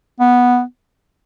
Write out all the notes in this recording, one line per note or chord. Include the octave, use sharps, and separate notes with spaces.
B3